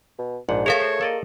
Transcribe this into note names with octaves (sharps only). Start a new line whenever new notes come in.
B2
A#1 G#2 D4 F#5
A3 G#4 A#4 C#5 F5
C5
A#3 A4 D5 D#5